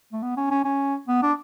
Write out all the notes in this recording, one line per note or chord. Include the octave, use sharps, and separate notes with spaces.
A3
B3
C#4
C#4
C#4
B3
D4